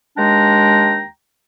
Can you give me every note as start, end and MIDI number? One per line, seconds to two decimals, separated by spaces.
0.17 1.03 39
0.17 1.03 56
0.17 1.03 62
0.17 1.03 79
0.17 1.03 82